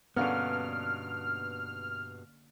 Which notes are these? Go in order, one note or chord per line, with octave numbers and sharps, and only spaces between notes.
G2 B2 D3 A#3 B3 C#4 F6